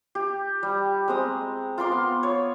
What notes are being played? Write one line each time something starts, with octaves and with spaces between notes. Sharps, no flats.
G4
G3
G#3 C4 A#5 D#6
F4 A#4 C6 D6
B3
C#5